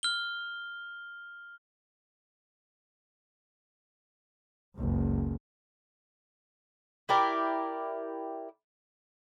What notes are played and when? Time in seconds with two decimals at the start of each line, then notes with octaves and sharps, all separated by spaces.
0.03 F6 G7
4.76 F#1 C#2
7.09 E4 G4 A#4 D5